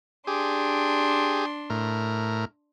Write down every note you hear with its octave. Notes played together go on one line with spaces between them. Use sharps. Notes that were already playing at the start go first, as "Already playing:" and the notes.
D4 G4 G#4 C6
A2 A#4